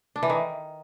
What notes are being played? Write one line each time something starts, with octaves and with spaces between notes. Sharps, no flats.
D4
E3
D#3